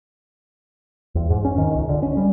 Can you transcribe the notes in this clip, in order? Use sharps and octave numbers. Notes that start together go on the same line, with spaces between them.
E2
G#2
C#4
D#3
C#2
D3
C#4
G3